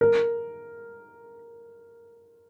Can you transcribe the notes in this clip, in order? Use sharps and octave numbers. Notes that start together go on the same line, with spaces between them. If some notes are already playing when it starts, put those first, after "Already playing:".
A#4